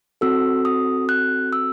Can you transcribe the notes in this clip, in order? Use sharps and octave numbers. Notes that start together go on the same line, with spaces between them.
C4 F#4 A4 E6
D#6
F#6
E6